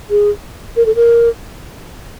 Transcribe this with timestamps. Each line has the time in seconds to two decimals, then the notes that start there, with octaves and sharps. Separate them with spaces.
0.10 G#4
0.76 A#4
0.86 A4
0.95 A#4